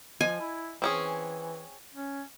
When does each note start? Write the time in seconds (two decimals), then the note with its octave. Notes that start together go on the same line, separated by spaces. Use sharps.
0.21 F3 D#5 G#5
0.40 E4
0.82 E3 C4 C#4 G#4
1.94 C#4